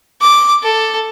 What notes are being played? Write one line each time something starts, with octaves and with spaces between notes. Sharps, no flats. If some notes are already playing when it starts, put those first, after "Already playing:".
D6
A4